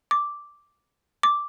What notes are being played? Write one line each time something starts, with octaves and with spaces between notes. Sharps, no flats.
D6
D6